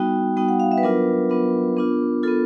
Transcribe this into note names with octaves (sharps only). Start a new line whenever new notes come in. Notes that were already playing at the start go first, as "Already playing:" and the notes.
Already playing: G3 B3 D#4 F#4 G5
G3 B3 D#4 F#4 G5
F#5
F5
E5
B4
F#3 B3 D4 F4 A#4
F#3 B3 D4 F4
B3 D4 F4
B3 D4 F4 A4